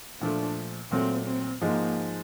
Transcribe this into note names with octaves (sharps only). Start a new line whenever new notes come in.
A#2 F3 A3 D4
A#2 F#3 A3 C4
C4
G#2 F3 G#3 A#3